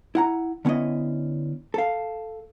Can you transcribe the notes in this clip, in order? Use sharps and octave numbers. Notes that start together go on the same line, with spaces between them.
E4 F#5 A#5
D3 B3 C#4 E4 D#5
A4 F5